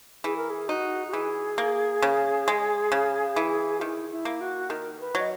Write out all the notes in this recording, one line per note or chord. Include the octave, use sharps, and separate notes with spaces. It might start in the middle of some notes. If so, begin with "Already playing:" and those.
E3 G#4
A#4
G#4
D#4 F#4
F#4
E3 G#4
A#3
C#3
G#3
C#3
E3
D#3 E4
E4
A#3
F#4
D#3 A#4
B4
F#3 D#5